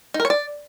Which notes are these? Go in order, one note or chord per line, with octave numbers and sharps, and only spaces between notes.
D#4
A#4
C#5
D5